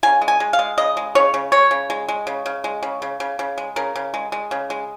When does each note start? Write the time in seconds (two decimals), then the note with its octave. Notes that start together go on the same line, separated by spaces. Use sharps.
0.03 C#3 G#5
0.22 G#3
0.28 G#5
0.40 G#3
0.53 F5
0.59 G#3
0.78 C#3 D#5
0.97 G#3
1.15 C#3 C#5
1.34 C#3
1.52 G#3 C#5
1.71 C#3
1.90 G#3
2.09 G#3
2.27 C#3
2.46 C#3
2.64 G#3
2.83 C#3
3.02 C#3
3.20 C#3
3.39 C#3
3.58 G#3
3.76 C#3 A#4
3.96 C#3
4.14 G#3
4.32 G#3
4.51 C#3
4.70 G#3